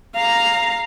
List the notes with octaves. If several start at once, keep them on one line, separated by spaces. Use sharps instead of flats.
F5 A#5